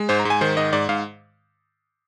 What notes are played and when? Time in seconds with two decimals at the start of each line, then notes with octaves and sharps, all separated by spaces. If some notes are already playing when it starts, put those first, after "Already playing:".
Already playing: G#3
0.09 G#2 C5
0.20 A#5
0.25 G#2
0.30 G#5
0.41 D#3 C5
0.57 G#2 D#5
0.73 G#2 D5
0.89 G#2 F5